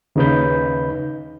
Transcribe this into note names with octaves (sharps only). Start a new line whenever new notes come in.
D#2 C#3 D#4 B4 B5 G6